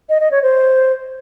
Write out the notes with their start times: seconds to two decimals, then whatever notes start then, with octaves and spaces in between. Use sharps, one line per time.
0.09 D#5
0.20 D#5
0.31 C#5
0.42 C5